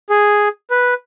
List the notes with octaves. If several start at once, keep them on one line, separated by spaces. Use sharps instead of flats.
G#4
B4